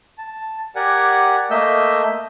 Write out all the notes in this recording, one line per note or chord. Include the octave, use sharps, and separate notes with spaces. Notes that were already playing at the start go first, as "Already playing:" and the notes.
A5
G4 A#4 D5 F#5 G#5
A3 A#3 D#5 E5 E6 G6